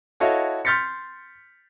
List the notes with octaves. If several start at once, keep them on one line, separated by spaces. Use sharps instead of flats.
E4 F#4 A4 C#5 D#5 F5
C6 F6 G6 A6 B6 C#7